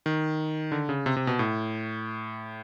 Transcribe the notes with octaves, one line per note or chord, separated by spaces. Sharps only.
D#3
D3
C#3
C3
C3
B2
A2